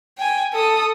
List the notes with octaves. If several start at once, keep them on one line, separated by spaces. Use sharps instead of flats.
G5 G#5
A4 D#6